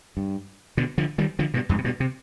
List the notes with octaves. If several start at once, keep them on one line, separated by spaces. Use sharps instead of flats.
G2
B2 D3
D3 F3
D#3 G3
D3 F3
G2 B2
F2 G#2
C3
G2 B2
C3